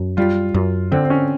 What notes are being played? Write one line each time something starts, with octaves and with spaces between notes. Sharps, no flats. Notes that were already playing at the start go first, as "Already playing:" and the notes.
Already playing: F#2
G3 F4
F#2
D3 C4
C4
C#4